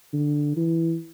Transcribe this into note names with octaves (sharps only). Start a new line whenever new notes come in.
D3
E3